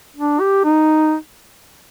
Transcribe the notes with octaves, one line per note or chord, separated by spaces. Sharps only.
D4
G4
D#4